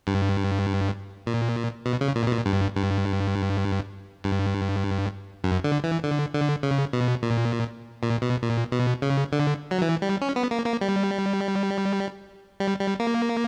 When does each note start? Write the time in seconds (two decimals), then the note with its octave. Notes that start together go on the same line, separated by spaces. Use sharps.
0.07 G2
1.27 A#2
1.86 B2
2.01 C#3
2.15 A#2
2.27 B2
2.31 A#2
2.46 G2
2.75 G2
4.24 G2
5.44 F#2
5.64 D3
5.84 E3
6.04 D3
6.34 D3
6.63 C#3
6.93 B2
7.23 A#2
8.03 A#2
8.22 B2
8.42 A#2
8.72 B2
9.02 C#3
9.32 D3
9.71 F#3
9.82 E3
10.02 G3
10.21 C#4
10.36 B3
10.51 A#3
10.66 A#3
10.81 G3
12.60 G3
12.80 G3
13.00 A#3